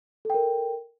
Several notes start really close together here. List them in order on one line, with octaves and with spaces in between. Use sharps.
A4 G5 A#4